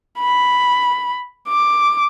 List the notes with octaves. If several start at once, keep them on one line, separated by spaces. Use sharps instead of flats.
B5
D6